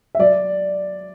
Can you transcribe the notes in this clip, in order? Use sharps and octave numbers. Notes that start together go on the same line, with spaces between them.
E5
F#3 D5